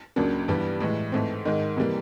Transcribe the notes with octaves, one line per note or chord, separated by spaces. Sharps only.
C#2 C#3 F#3 A#3 D4
G2 E3 G3 B3
A2 E3 G#3
G#2 E3 A3 C4
G#2 D#3 G#3
C3 E3 G3 A#3